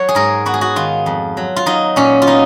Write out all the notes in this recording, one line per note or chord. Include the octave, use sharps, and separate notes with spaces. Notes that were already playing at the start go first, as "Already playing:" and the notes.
Already playing: F#3 C#5
G#4
G#2 A#4
B3 F#4
G#4
F#4
D#3 F4
F2
F#3
F4
F#3 D#4
A#2 C#4
F4
B3 D#4